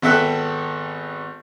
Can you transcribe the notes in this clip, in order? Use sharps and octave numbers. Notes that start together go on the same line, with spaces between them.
G#1 B3 A4 E5 G5 F#6